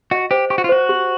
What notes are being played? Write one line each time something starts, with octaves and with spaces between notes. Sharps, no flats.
F#4 D#5
G4 C5
G4 C#6
F#4
F4
F#4 C5
G4